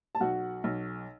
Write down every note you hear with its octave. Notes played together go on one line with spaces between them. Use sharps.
A5
B1 F#4 F#5
B1